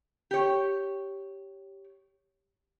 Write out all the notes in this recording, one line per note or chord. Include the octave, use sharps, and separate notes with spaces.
G4 C#5